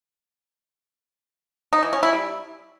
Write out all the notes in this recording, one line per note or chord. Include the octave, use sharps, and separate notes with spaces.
D#4
E3
C#4
E4
G3